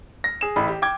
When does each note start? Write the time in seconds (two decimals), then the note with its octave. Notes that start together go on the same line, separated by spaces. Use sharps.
0.24 A#6
0.41 G#4 E7
0.56 A1 E4 B5
0.68 G4
0.82 G5 D6 G#6